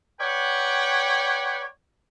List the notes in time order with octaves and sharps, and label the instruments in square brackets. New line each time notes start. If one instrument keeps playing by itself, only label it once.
[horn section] B4 C#5 D5 F#5 G5